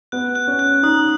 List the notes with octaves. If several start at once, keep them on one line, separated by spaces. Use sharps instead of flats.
B3 F#6
F#6
C#4
F#6
D#4 D#6